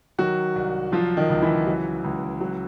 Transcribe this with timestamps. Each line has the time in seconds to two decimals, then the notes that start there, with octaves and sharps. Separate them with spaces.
0.18 D#3 F#3 F#4
0.55 C2
0.92 F3 F#3 F4
1.17 D#3 D#4
1.30 C#2
1.42 E3 E4
1.67 F#3
2.04 C#2
2.41 F#3